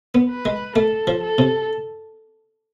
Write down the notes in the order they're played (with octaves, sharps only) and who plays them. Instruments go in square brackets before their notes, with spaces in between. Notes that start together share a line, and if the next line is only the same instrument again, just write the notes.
[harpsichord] B3
[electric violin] B4
[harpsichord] G#3
[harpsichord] A3 [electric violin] A4
[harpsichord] F3
[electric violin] A4
[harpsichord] C3